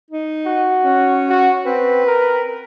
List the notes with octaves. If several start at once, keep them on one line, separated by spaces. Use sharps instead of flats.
D#4
F#4
C#4
F#4
C4 B4
A#4